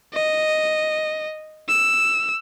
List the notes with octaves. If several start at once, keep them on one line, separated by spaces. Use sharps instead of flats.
D#5
E6